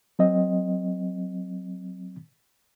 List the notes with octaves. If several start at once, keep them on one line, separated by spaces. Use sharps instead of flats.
F#3 C4 D#5